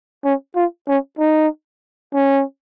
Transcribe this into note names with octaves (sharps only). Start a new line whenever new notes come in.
C#4
F4
C#4
D#4
C#4